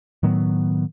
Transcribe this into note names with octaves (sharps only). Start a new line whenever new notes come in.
A2 D#3 F#3 B3